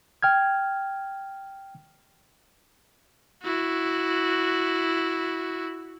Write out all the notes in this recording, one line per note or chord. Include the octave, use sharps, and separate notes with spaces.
G5 F6 G#6
E4 F#4